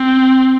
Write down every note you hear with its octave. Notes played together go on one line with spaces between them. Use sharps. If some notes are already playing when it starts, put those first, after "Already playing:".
Already playing: C4